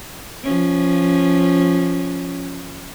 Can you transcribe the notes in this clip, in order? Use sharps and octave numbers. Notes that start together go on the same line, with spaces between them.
F3 C#4